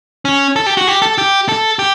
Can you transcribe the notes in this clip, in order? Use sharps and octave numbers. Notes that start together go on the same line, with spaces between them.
C#4
A4
G4
F#4
G4
A4
G4
A4
G4